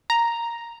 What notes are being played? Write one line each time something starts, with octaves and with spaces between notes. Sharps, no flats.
A#5